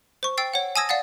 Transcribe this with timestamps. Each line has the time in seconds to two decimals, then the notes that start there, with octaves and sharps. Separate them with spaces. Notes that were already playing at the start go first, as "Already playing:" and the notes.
0.23 C5 C#6
0.37 G5 E6 A6 C7
0.54 C#5 F#5
0.76 G#5 A5 D#6 E6 G#6 A#6
0.89 D5 F5 F#5 A6